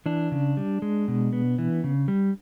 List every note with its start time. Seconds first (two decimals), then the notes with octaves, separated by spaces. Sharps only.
0.06 E3 D4
0.32 C#3
0.57 G3
0.82 G#3
1.08 B2
1.33 B3
1.59 E3
1.84 C#3
2.08 G3